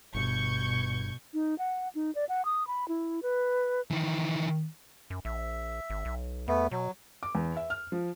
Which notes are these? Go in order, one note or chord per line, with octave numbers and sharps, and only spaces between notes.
G1 G2 B2 C#6 G6 G#6
D#4
F#5
D#4
D5
F#5
D#6
B5
E4
B4
D#3 E3
F#2
A#1 E5
G#1
B1
E2 A3 B3
B2 F#3
D6
E2
E5
F6
F3